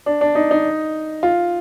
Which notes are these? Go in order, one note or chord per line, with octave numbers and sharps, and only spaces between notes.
D4
D4
D#4
D#4
F4